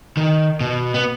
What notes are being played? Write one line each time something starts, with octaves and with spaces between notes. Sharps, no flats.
D#3
B2
B3